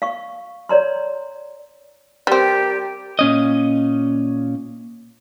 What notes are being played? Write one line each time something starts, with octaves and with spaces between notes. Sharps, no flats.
F5 C#6
C#5 D5 A#5 C6
G3 C4 G4 A#4 D5
A#2 C#4 D#5